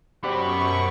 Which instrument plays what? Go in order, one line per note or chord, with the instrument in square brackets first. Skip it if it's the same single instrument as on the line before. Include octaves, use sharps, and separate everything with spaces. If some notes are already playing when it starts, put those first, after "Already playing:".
[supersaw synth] F#2 C#6 [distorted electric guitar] B3 F#4 [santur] G4 C5 D5 [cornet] B5